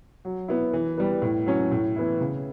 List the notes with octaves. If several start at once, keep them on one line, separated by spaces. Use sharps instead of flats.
F#3
B3 E4
E3
G3 B3
A2
F#3 C#4
A2
E3 B3 E4
C#3